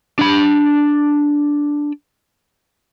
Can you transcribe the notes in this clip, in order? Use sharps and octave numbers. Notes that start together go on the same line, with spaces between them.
D4 B5